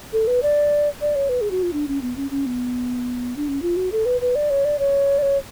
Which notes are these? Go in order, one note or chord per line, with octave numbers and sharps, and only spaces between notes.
A4
B4
D5
D5
C#5
B4
G#4
F#4
F4
D4
C#4
B3
C#4
C#4
B3
D4
C#4
F4
F#4
A4
B4
B4
D5
C#5
D5
C#5
D5
C#5